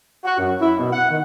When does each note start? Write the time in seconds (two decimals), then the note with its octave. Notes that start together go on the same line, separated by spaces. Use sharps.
0.25 F#4
0.38 F#2
0.60 E4
0.79 B2
0.92 F#5
1.10 D#3